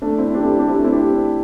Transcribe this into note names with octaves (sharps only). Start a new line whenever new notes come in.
A3 D4
C4 E4
D4 G4
E4 A4
D4 G4
C4 E4
A3 D4
C4 E4
D4 G4